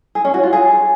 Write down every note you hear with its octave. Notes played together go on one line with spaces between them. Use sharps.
G#4
C#4
F#4
F4
G#4